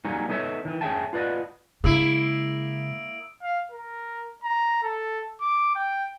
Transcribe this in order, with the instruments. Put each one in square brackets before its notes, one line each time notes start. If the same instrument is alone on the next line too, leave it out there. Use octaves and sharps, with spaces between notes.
[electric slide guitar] F#3 G3 A#3 C#4 D#4
B3 D#4 A4 C#5 E5
D#3 E3
C#4 G#4 A4 E5 G5 A5
F4 B4 D5 D#5 F#5
[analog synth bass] C#3 [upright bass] G#3 [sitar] A#3 E4 [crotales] D#6 E6 D7
[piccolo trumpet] F5
A#4
A#5
A4
D6
G5